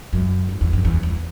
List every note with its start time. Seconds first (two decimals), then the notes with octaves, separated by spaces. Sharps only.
0.13 F#2
0.49 G#2
0.61 E2
0.73 F#2
0.85 E2
1.03 E2